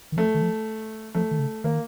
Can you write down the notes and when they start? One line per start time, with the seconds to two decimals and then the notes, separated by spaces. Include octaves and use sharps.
0.12 D#3
0.17 F3 A3
0.34 D#3
0.42 F3
1.15 F3 A3
1.31 D#3
1.39 C#3
1.64 D#3 A#3